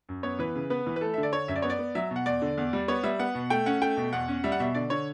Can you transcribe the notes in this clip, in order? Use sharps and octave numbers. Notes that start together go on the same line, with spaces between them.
F#2
B3 C#5
E3 B4
C#3
B3 B4
E3
B4
A3 A4
D3 E5
D5
D3 C#5
F#2 E5
D5
B3 C#5
D5
B3
F#3 E5
B2
F#5
E2 D5
D3
E2
G3
B3 C#5
G3 E5
B3 F#5
B2
A3 G5
C#4 F#5
A3 G5
B2
E2 F#5
C#4
G3 E5
F#5
B2 E5
D3 D5
D3 C#5